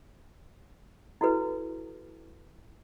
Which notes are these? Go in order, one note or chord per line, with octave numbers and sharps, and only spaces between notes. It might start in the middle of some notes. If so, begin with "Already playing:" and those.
E4 F#4 A4 B4